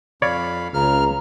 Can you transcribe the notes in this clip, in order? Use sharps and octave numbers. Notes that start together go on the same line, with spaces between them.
F2 C#5 D5 F5 B5
C#2 C#3 A#5 F6